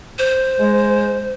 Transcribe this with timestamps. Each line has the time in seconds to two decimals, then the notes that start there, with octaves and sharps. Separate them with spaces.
0.19 C5
0.59 G#3